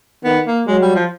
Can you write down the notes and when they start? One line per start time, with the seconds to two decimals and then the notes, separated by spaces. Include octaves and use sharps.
0.24 D#3 B3
0.46 A#3
0.67 F#3 G#3
0.81 G3
0.95 F3